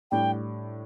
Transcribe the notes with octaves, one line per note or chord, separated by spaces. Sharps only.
A2 G3 D4 G5